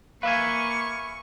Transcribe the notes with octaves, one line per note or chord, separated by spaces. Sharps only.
A#3 B4 E5 F5 G#5 C#6